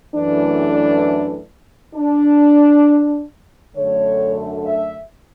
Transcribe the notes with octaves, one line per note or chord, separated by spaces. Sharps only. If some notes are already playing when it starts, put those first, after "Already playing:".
F#2 E3 A3 D4
D4
F#2 D3 A3 C#5
E5